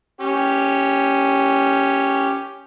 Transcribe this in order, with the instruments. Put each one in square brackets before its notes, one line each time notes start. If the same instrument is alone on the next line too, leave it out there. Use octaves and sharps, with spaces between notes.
[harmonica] C#4 G4